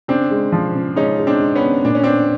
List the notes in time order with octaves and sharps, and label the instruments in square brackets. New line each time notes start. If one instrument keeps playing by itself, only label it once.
[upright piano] C#3 [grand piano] C4 D4
[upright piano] G#3
F3
C#3
[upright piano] G#3 [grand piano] C#4 D#4
[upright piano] G#3
[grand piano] C4 D4
[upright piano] G#3
[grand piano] B3 C#4
[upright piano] C#3
[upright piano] A#2 [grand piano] D4
[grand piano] C#4
[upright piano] B3 [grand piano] C4 D4